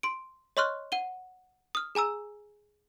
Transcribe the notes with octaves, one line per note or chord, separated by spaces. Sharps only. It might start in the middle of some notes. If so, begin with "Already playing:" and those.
C6 D7
C#5 D#5 C6 C#6 F6 F#6
F#5 D#7 G7
D#6 F6
G#4 G#5 A#5 E6